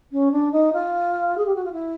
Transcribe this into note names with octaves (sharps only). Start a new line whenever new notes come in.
C#4
D4
D#4
F4
G#4
G4
F#4
F4
E4